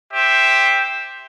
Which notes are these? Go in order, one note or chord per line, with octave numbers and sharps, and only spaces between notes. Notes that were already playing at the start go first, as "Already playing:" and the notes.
G4 C5 E5